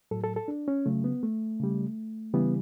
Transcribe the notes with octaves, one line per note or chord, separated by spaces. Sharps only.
A2 F#3 A4
A4
A4
D4
C#4
C#3 F#3 A3
B3
A3
C#3 G3
C#3 E3 G3 B3